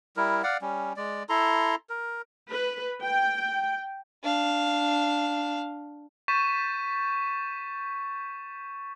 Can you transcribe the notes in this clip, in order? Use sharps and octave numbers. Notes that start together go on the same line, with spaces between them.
G3 E4 A#4
D5 F5 F#5
G3 C#4
G#3 D5
E4 A4 A#5 C6
A#4
B4
G5
D4 F5
C#6 G6 A6 B6 D#7 E7